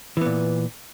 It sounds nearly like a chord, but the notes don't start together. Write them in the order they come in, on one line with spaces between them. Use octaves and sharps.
E3 B3 A#2